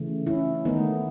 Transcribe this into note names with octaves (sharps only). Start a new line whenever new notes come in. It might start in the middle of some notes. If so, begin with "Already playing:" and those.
Already playing: C#3 E3 A3
C#4 E4
D#3 A3 B3 D#4